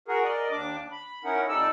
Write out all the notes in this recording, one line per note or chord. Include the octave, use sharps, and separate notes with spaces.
F#4 G#4 A#4
A#4 D5 D#5
D#2 D4 D6
B5
C#4 D#4 E4 A#4 F#5
F2 G3 D#4 A4 D5 E6